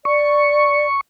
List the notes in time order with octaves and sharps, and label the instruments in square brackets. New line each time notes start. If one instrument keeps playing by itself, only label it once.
[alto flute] D5 [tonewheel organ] C#6